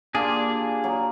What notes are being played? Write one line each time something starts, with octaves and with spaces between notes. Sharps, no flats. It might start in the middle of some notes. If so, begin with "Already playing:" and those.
A#2 D4 F4 G4 G#4
F#3